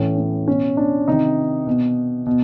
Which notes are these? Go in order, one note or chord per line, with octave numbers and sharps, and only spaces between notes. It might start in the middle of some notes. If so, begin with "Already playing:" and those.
Already playing: A2 E3 C#4
C#4
B2 C#4
D4
C3 D#3 D#4
B2
B2